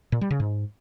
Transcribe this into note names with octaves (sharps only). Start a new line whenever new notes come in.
A#2
G3
C#3
G#2